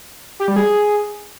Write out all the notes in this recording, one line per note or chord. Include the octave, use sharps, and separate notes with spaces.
G4
G3
G#4